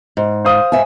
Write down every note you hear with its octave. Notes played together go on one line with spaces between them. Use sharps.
G#2
C5 F5 D#6
G#2 E5 G#5